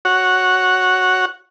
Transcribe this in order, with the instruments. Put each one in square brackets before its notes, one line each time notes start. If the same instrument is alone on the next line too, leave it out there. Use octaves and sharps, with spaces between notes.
[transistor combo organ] F#4 C#5 F#5